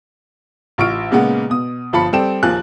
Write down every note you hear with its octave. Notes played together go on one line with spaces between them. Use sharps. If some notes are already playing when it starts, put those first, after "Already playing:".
A1 F4 C#6 F6 D7
A#2 C#3 G#3 A#3 B3
B2 D#6
G1 F3 F5 A5 B5 C#7
G3 C4 A4 G5 E7
A#1 D#2 F3 A#3 G#5 F#6